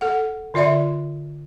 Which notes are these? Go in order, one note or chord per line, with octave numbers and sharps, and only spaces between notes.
A4 F#5
D3 F4 D5 E5 C6